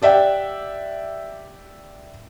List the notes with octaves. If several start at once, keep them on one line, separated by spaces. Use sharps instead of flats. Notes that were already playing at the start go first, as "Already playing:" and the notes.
G4 D5 E5 F#5 G5